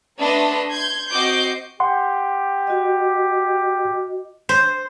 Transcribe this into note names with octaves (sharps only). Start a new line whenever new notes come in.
A3 B3 D4 B4 D#5 C6
C6 G6 G#6
C4 F#4 D#5 D6 G6 C7
G4 F#5 C6
F#4 D#5
C5